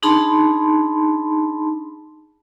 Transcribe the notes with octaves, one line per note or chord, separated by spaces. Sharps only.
D4 D#4 G#4 A5 B5 C6